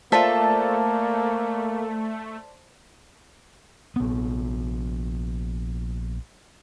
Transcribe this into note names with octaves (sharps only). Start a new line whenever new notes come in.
A3 A#3 F4 A4 C5 D5 E5 A5
A#1 B3